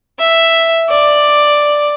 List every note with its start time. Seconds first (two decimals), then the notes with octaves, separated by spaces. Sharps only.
0.19 E5
0.90 D5